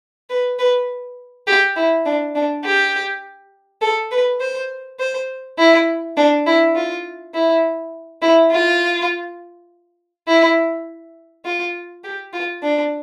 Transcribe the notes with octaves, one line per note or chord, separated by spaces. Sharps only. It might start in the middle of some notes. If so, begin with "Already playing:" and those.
B4
B4
G4
E4
D4
D4
G4
A4
B4
C5
C5
E4
D4
E4
F4
E4
E4
F4
E4
F4
G4
F4
D4